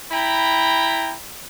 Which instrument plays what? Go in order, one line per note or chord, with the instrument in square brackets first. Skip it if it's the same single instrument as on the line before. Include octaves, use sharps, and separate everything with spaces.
[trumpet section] E4 G5 A#5 B5